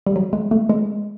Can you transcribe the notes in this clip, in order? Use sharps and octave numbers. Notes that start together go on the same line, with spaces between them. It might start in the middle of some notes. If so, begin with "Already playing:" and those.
G3
F#3
G#3
A3
G#3